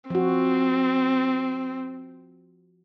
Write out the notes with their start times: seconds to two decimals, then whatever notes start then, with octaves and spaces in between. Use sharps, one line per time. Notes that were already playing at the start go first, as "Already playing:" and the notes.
0.10 F3 C4 F#4